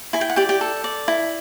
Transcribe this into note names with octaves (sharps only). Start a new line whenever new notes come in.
E4 G#5
G5
F#5
G4 D5 G5
G4 G5
A4
D5
E4